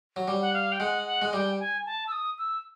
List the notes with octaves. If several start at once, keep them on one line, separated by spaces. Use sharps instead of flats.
F#3
G3
F#5
F5
G5
G#3 F#5
F#5
G#3
G3 G5
G#5
A5
E6
D#6
E6